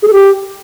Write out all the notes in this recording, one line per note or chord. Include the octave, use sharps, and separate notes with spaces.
G#4
A4
G4